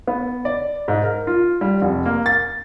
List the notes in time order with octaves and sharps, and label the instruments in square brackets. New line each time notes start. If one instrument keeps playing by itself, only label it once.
[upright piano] B3
D5
G#2
A#4
F4
G3
F1
A#3
A6